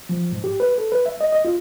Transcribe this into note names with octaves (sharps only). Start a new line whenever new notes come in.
F3
G#2
G4
B4
A4
B4
E5
D#5
D#5
F4